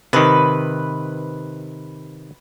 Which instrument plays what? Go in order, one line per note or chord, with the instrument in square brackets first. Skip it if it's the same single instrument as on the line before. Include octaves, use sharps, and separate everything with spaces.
[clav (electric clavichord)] C3 D#3 [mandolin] B4